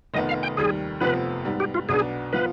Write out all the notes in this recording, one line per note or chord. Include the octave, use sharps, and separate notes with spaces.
F1 F2 D#3 B3 D#4 D#5
F5
G5
D#2 D#3 G3 G#4
F1 F2 C3 F3 B3 B4
G#2 G3 B3
G4
F4
B1 B2 B3 D4 G#4
F3 B3 F4 B4